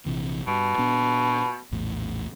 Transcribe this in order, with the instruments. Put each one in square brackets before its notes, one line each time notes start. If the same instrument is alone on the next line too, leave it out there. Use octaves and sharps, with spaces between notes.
[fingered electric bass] A#1 C3 E3
[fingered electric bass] G2 [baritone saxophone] B2
[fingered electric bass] A#2 B3 D4
A#1 E2 A2